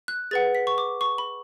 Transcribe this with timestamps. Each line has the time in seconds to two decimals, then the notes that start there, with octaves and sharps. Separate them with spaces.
0.08 F#6
0.31 G#4 B4 F#5 A6
0.55 B6
0.67 C#6
0.78 D6
1.01 C#6
1.18 B5